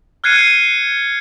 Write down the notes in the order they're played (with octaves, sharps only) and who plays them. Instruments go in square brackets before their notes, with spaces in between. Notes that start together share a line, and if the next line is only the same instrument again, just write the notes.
[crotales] F6 F#6 G#6 C7 C#7 D#7